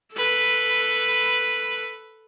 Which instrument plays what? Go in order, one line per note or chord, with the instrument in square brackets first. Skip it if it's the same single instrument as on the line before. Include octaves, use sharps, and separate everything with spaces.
[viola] A4 B4